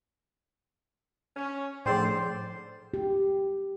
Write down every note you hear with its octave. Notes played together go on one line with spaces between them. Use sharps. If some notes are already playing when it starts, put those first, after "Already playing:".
C#4
A2 D3 F3 G#4 C5 D5 G5
G4